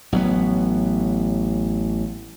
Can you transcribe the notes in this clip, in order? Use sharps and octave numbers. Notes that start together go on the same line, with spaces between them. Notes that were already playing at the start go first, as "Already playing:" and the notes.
A1 F#3 G#3 B3